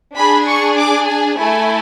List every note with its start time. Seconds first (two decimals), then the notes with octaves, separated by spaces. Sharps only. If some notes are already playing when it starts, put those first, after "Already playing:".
0.16 D4 G#4 B5
0.47 C#6
0.77 D6
1.07 G#5
1.37 A3 E4 A4 G#5